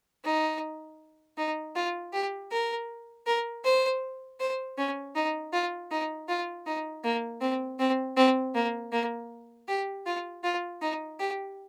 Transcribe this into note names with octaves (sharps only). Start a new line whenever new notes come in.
D#4
D#4
F4
G4
A#4
A#4
C5
C5
C#4
D#4
F4
D#4
F4
D#4
A#3
C4
C4
C4
A#3
A#3
G4
F4
F4
D#4
G4